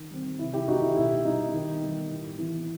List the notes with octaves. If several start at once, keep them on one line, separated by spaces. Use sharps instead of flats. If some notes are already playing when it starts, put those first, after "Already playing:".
Already playing: D#3
G3 C4
C3 E4
E4 G4
D#3 A3 D#4 F#4
E4
B2 E4
G3 B3 D#4
D#3
G3 B3
A2
E3 B3